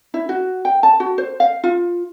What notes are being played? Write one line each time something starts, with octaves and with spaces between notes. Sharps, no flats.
E4
F#4
G5
A5
F#4
C5
F5
F4